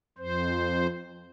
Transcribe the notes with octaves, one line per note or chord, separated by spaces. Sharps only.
F2 C5